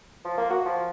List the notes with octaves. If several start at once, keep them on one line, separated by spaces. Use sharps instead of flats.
F3
A#3
F#4
F3